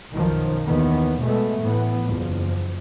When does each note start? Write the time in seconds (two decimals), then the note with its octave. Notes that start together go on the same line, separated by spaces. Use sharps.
0.13 B1 F#2 B2 D#3 F3
0.65 D#2 D#3 E3 B3
1.20 B2 G#3 A3 B3
1.60 A2 E3 B3
2.06 F#1 E2 F3